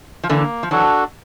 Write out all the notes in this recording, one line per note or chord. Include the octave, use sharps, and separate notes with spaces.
F3
D3 E3 A#3
F3
E3 F#3 D4 F#4 A4